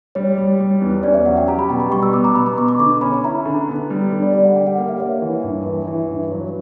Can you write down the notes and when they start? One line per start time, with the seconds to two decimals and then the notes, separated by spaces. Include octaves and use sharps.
0.15 G3 C#5
0.38 G3
0.60 G3
0.82 E2
1.03 C#4 D5
1.14 E5
1.25 F#3 F#5
1.37 G5
1.48 G4 A#5
1.59 B5
1.69 B2 G5
1.80 B5
1.91 G3 C#6
2.03 E6
2.13 B3 D6
2.24 A#5
2.36 B2 B5
2.46 D6
2.58 B2 C#6
2.68 D6
2.79 D3 C#6
3.01 C#4 B5
3.14 B5
3.24 E4 A#5
3.45 D3
3.68 B3
3.90 G3
4.12 D3
4.22 D5
4.33 G3 D5
4.44 F#5
4.56 G4 G5
4.67 F#5
4.78 A#3 F#5
4.89 E5
5.00 A#3 C#5
5.22 E3
5.44 G2
5.66 E3
5.87 E3
6.09 G2
6.31 F#3 C#5